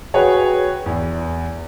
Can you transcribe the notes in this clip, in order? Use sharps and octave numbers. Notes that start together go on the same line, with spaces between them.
F#4 G#4 B4 C#5 G5
E2